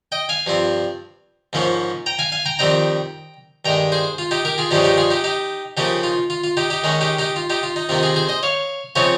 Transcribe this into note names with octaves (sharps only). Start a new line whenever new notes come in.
D#5 G5
F5 G#5
G2 F3 C4
G#2 F3 A#3 C#4
G5 A#5
F5 G#5
F5 G#5
G5 A#5
F2 D#3 G3 C4 D#4 G5 A#5
G2 D#3 G#3 G5 A#5
G#4 C5
F4
D#4 G4
G4 A#4
F4 G#4
G2 F3 G#3 C#4 D#4 G4
D#4 G4
F4 G#4
D#4 G4
D#4 G4
C#3 F3 A#3 D#4 G4
F4
F4
F4
D#4 G4
D#4 G4
D#3 G#3 C#4 D#4
D#4 G4
D#4 G4
F4
D#4 G4
F4
D#4
C3 D#3 A#3 D#4 F4
F4 G#4
G#4 C5
C5 D#5
C#5 F5
C#3 F3 C4 D#4 C#5 F5